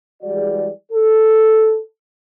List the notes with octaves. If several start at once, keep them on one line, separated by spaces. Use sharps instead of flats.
E3 G3 G#3 F#4 G#4 D5
A4